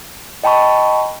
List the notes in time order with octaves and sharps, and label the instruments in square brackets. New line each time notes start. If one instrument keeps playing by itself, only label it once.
[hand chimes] D#5 G5 A5 B5 C#6